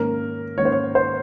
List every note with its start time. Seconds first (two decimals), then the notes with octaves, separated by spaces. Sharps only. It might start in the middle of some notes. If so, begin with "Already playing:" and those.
Already playing: G#2 D#3 A#3 C#4 A#4
0.57 G#2 D#3 A#3 C#4 C#5
0.65 C5
0.72 C#5
0.95 C5